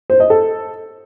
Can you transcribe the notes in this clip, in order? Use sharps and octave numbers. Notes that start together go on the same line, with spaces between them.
C5
D#5
A4